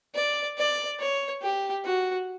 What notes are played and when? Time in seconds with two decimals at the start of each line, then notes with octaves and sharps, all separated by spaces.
0.15 D5
0.58 D5
1.00 C#5
1.42 G4
1.84 F#4